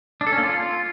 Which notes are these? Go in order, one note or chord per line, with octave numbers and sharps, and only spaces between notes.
D4
A4
C#4
A#3
F4